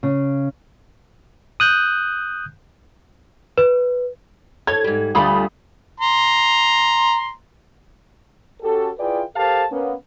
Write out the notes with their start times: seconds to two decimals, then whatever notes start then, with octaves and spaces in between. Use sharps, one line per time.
0.03 C#3
1.60 D#6 F#6 G6
3.58 B4
4.67 A4 C#5 G#6
4.84 G#2 G3
5.15 D2 G3 A3 F4 B5 D#6
6.00 A#5 C6
8.62 C#4 F#4 G4 A4
8.99 E4 F4 G#4 B4 D5 G5
9.36 G4 A4 A#4 C5 F5 A5
9.70 A#3 B3 C#4